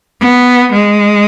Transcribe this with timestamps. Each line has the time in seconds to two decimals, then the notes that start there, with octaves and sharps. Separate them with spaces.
0.21 B3
0.72 G#3